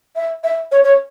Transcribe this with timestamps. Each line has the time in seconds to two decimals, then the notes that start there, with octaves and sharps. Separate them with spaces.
0.16 E5
0.43 E5
0.72 C#5
0.84 C#5